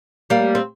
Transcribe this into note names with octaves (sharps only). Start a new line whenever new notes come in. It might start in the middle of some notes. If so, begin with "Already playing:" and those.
G3 A#3
C4